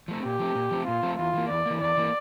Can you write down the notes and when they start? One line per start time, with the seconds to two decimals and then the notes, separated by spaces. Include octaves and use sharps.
0.08 F3 A3 C4
0.24 A#2 G4
0.39 F3 A3 C4
0.55 A#2
0.71 F3 A3 C4
0.87 A#2 F4
1.03 F3 A3 C4
1.19 E2 F4
1.34 E3 A#3
1.50 E2 D5
1.66 E3 A#3
1.81 E2 D5
1.97 E3 A#3